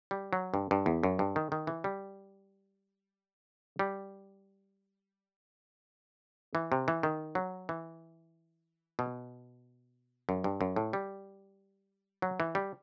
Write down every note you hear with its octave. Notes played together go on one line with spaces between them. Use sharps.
G3
F#3
G2
G2
E2
F#2
G2
D#3
D#3
E3
G3
G3
E3
C3
E3
D#3
F#3
E3
B2
F#2
G2
F#2
A2
G3
F#3
E3
G3